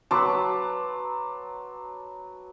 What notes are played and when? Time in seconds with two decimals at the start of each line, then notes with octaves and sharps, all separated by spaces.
0.11 F#3 B4 A5 C6 D6